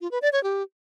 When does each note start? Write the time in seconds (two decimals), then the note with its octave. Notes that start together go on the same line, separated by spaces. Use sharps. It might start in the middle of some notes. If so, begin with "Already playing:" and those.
0.01 F4
0.11 B4
0.22 D5
0.33 C#5
0.43 G4